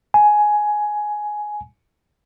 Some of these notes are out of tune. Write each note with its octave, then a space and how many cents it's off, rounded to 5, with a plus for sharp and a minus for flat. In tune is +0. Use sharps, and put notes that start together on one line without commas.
G#5 +10